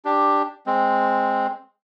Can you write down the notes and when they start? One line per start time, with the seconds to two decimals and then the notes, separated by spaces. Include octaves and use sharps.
0.05 D4 G4
0.66 G#3 C4